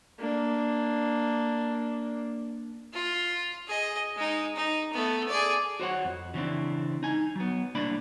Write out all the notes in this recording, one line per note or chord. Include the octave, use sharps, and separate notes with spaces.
A#3 D4
F4
G#4 D#5
G#3 D#4
D#4
A3 B3
G#4 D5
F#4 C5 C#5 F#5
F2
C#3 E3 C4 D4
D#4 G#5
F#3 B3
C2 A#3 D4 D5 B5